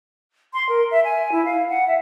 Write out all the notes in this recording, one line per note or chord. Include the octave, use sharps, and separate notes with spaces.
C6
A#4
E5
G#5
E4
F5
F#5
E5